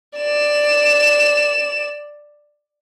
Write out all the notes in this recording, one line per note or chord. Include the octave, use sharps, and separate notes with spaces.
D5 E7